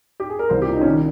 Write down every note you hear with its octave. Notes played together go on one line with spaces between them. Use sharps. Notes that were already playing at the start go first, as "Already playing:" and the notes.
G4
G#4
A#4
C2 C5
G4
A#2
D#4
C#4
D#3